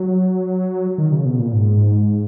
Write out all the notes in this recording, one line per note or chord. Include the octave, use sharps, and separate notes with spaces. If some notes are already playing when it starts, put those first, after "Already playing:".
Already playing: F#3
D#3
C#3
B2
A#2
G#2